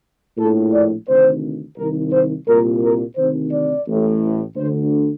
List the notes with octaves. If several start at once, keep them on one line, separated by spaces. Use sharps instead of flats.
A#1 A2 A4
D5
D2 C3 D#3 C5
C2 C3 D#3 A#4
C5
C2 A#2 A#4
A#4
D2 C3 D#3 C5
D5
A1 A2
D2 D3 C5